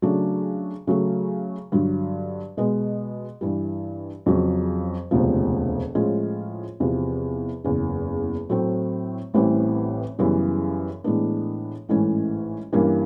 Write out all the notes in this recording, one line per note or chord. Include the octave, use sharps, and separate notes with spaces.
C#3 F#3 A3 D4
C#3 F#3 A3
G2 D3 F#3
B2 G#3 B3
G2 E3 G3
F2 C#3 F#3
E1 D2 C3 F3
A2 F3 G#3 C#4 F4
E2 C3 F3
F#1 E2 C#3
A2 F#3 A3 C4
A1 A2 E3 G3 C4
F#2 C#3 E3 G3 B3
A2 E3 G#3 B3 D4
A1 G#2 E3 A3 C#4
G2 E3 G3 A#3 C#4